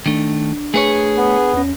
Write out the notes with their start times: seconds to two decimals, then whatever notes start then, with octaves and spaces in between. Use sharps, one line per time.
0.06 D#3 A3 D4
0.74 A3 G#4 B4 C#5
1.17 B3
1.54 E2 C#4